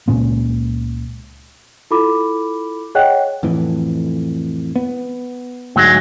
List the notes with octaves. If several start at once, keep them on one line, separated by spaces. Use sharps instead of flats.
C#2 A#2 C#3 B3
E4 F4 A4 B5 D6
G#4 C#5 D#5 F#5 G5 F#6
F2 A2 E3
B3
D2 G#2 F#3 G#3